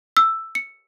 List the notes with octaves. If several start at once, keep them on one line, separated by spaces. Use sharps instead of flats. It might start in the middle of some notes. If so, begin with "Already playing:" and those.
E6
C#7